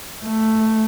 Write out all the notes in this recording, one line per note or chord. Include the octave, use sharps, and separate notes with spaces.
A3